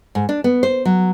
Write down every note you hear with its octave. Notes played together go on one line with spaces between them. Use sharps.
G#2
D4
B3
C5
F#3